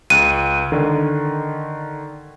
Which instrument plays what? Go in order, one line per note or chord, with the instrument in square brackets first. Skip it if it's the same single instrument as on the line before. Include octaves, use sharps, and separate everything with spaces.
[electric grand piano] C#2 F#6 [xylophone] D#7
[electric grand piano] D3 D#3